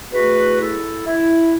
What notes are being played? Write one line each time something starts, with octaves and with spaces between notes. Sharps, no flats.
E2 E3 A3 F#4 B4
E4 A4
E4